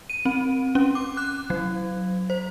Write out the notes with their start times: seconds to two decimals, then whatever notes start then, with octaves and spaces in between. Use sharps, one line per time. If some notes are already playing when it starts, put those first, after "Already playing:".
0.10 D#7
0.25 C4
0.75 C#4
0.95 D6
1.17 F#6
1.50 F#3
2.30 C5